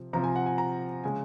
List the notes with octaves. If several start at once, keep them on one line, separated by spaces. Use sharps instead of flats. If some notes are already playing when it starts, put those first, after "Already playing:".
Already playing: C3 F3
C3 F3 C4 A#5
G#5
F#5
G#5
A#5
C#3 G#3 G#5